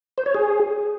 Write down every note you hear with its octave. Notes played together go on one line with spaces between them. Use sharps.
C5
C#5
G#4